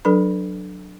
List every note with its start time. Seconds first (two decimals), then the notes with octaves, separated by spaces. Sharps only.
0.05 F#3 D4 A4 B4 B5